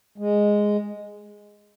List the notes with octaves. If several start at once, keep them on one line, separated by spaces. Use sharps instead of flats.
G#3